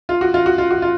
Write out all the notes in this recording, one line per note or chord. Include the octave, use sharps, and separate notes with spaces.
F4
F#4
F4
F#4
F4
F#4
F4